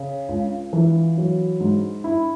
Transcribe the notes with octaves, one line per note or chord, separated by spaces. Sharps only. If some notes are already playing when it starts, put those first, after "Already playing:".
Already playing: C#3
C#2
E3
F#3
G#2
E4